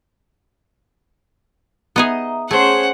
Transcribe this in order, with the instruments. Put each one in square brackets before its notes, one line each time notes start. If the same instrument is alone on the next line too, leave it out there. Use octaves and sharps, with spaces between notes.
[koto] B3 D#4 G#4 [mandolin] D#5 [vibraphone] E5 A#5 D#6
[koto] A3 [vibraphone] C#4 C#5 C#6 [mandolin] G#4 C5 [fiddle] F#5